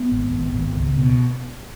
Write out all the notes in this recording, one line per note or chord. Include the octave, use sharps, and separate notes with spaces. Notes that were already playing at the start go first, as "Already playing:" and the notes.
Already playing: B3
G#1
G#1
G#1
C#2
B2